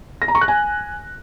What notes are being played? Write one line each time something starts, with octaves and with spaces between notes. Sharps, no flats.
A#6
A#5
C#6
F#6
G#5